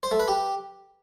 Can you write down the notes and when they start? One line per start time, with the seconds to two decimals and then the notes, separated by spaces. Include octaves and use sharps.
0.03 C5
0.11 A3
0.20 B4
0.28 G4